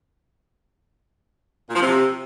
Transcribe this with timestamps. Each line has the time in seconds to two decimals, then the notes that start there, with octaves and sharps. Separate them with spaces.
1.70 A#2
1.75 F3
1.81 C3